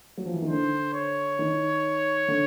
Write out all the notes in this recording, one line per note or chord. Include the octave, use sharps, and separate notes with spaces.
F#3
F3
E3
D#3
D3 C5
C#5
D#3
D3